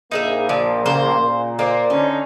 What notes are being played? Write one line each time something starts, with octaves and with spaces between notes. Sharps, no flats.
A#1 A#3 D#4 G#4 E5
A#2 F3 D5
C#3 C5
A#2
A#3 C5 D5
D3 C#4 D#4